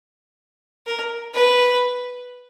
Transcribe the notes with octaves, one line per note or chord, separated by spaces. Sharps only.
A#4
B4